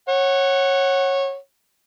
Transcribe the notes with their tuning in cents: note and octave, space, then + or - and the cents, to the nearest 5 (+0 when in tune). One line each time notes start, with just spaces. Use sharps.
C#5 -15 F#5 +5